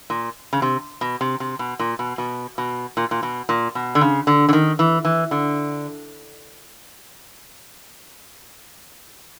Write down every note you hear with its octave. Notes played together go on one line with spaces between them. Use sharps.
A#2
C#3
C3
B2
C3
C3
B2
A#2
B2
B2
B2
A#2
A#2
B2
A#2
B2
D3
C#3
D3
D3
D#3
E3
E3
D3